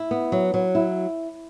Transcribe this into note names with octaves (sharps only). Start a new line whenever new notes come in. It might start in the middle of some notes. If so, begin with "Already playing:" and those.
Already playing: E4
B3
F#3
F#3
E4